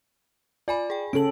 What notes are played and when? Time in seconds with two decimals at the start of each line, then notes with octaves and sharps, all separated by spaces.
0.68 F4 D5 G#5 B5
0.90 G#4 G5
1.13 C#3 C#4 A4 D7 F#7